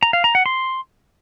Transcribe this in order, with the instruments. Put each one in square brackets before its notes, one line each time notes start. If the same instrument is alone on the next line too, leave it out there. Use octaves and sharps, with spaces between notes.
[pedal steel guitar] A#5
F5
A#5
F#5
C6